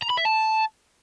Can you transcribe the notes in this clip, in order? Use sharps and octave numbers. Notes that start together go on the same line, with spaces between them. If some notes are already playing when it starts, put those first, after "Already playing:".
A#5
B5
E5
A5